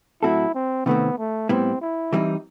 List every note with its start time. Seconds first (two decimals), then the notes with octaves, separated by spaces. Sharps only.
0.23 A2 F#3 C4 E4 F#4 A4
0.54 C4
0.86 C3 D#3 A3 B3 C4
1.18 A3
1.49 A2 G3 B3 C4 E4
1.82 E4
2.13 E3 G3 C4 D#4